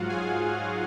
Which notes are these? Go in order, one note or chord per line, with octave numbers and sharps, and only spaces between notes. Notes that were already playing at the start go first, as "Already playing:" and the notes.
Already playing: G#2 F#3 F4 F#4 F5 F#5
G#4 G#5